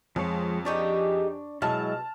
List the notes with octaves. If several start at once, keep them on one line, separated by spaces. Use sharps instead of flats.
F2 F3 G#3 C#5
D4 D#4 G4 G#4 D5 C#6
B2 F#3 G#3 E4 A5 F6